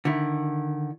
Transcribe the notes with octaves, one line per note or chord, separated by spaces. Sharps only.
D3 D#3 E4